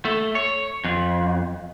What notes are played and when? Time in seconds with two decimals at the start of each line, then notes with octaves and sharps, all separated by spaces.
0.05 A3
0.35 C#5
0.84 F2